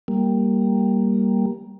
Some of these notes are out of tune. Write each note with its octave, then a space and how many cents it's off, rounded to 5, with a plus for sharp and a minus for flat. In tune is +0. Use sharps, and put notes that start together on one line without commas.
G3 +0 A#3 +0